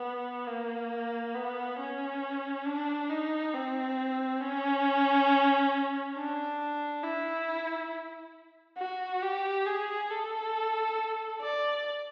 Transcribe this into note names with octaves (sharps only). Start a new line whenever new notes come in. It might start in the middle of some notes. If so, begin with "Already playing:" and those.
Already playing: B3
A#3
B3
C#4
D4
D#4
C4
C#4
D4
E4
F#4
G4
G#4
A4
D5